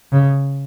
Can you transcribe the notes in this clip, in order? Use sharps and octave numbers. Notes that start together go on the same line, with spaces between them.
C#3